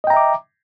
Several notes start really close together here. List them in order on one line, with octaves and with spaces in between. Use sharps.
D#5 G5 A#5 E5 D6